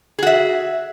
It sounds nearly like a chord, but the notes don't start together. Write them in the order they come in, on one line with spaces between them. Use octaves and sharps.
G#4 F#4 E5